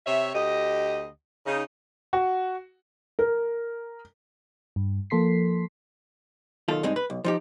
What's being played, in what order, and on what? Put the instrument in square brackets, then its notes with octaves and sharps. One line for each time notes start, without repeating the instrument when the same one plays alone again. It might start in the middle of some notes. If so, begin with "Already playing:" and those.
[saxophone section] C3 C#5 E5
D2 G4 D#5
C#3 D#4
[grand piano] F#4
[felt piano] A#4
[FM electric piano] G2
F3 A#3 A4 C6 B6 C7
[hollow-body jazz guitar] B1 D#3 F4 A4
G2 G#3 C4 D#4
B4
B1
F3 D#4 G4